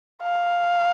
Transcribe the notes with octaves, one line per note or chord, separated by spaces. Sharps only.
F5